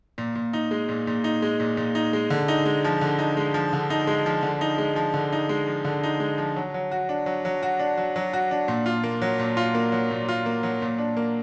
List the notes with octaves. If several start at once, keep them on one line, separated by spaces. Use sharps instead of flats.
A#2
A#2
D#4
G#3
A#2
A#2
D#4
G#3
A#2
A#2
D#4
G#3
D3
D#4
G#3
F3
D3
D#4
G#3
F3
D3
D#4
G#3
F3
D3
D#4
G#3
F3
D3
D#4
G#3
F3
D3
D#4
G#3
F3
F#3
F#3
F#4
D4
F#3
F#3
F#4
D4
F#3
F#3
F#4
D4
A#2
F4
A#3
F#3
A#2
F4
A#3
F#3
A#2
F4
A#3
F#3
A#2
D4
A#3